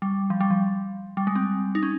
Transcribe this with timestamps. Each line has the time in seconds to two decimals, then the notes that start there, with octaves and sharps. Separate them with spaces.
0.02 G3
0.30 F3
0.40 G3
0.50 F3
1.17 G3
1.27 G#3
1.35 C4
1.75 D#4
1.83 C#4